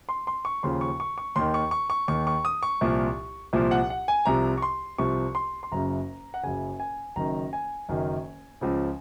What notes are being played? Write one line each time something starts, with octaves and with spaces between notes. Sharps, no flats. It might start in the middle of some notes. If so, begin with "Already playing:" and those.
C6
C6
C#6
D#2 C#3 F3 C6
C#6
C#6
C#6
D#2 D#3 C6
C#6
C#6
C#6
D#2 D#3 C#6
C#6
D#6
C#6
C2 A#2 F3
C2 A#2 F3
F#5
F#5
G#5
C2 C3 F3 A#5
C#6
C6
C2 C3 F3 C#6
C6
C6
F#1 F#2 C#3 A#5
F#5
F#1 F#2 C#3 G#5
G#5
F#1 F#2 D#3 A#5
G#5
F#1 F#2 D#3
C#2 C#3 F3